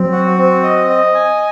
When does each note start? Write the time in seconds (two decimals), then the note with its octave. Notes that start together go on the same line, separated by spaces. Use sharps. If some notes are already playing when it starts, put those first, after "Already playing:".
Already playing: F#3 C4
0.12 F#4
0.38 C4
0.63 D#5
0.90 D#5
1.15 G#5